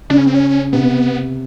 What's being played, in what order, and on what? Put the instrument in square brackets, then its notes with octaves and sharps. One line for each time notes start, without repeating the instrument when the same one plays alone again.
[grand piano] C#3 [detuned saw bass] D4
[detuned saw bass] C#4
C4
C#4
[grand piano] C3 [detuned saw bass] B3